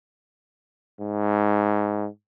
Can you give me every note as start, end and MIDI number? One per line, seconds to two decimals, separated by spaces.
1.00 2.08 44